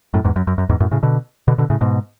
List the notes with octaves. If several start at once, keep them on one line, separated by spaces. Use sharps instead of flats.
F#2 A2
E2 G#2
F#2
F#2
F#2
E2 G#2
F#2 A2
A2 C#3
B2 D3
B2 D3
B2 D3
A2 C#3
G#2 B2